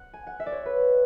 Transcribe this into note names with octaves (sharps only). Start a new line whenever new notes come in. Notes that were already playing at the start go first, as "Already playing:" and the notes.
Already playing: F#5
G#5
F#5
E5
D5
C#5
B4